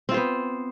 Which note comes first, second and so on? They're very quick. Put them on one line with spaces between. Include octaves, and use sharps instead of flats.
C4 F4 C5 B3